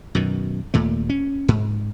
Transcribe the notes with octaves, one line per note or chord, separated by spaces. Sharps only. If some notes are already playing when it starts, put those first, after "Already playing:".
F#2 B2 D#3
D#2 A#2 A3
C#4
G#2